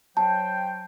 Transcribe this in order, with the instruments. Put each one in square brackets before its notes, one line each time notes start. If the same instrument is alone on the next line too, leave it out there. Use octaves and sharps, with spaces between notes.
[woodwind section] F#3 C5 G5 [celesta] A5